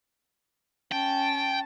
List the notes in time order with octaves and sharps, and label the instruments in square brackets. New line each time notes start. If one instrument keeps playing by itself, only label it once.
[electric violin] C#4 A5 [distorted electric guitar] G5